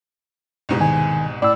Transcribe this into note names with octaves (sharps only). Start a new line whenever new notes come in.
C2 G#2 B2
D#3 G#5
A2 D5 E6